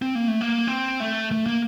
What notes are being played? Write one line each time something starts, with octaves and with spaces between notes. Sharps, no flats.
C4
A#3
A3
A#3
C4
A3
A3
A#3